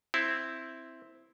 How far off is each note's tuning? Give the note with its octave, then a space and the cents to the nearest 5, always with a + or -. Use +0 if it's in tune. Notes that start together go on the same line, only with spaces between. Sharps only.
C4 +0 E4 +0